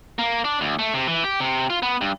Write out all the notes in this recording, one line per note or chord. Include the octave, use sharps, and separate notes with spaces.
A#3
D4
D2
A3
C3
E3
G4
C3
F4
B3
G2